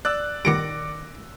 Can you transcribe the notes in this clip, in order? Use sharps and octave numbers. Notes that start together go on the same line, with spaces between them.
D5 E6 F#6
G2 A#2 D#3 B3 D6 A#6 C#7 D7